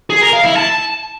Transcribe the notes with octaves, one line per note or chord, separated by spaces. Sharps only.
G#4
A#4
F5
E4
A5